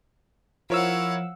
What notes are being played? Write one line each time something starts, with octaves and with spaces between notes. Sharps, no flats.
F3 E4 A#4 C#5 F5 F#5 E6